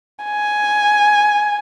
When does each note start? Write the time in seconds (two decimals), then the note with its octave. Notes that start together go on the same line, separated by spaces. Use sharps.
0.25 G#5